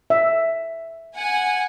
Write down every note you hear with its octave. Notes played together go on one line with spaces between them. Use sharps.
E5
F#5 G#5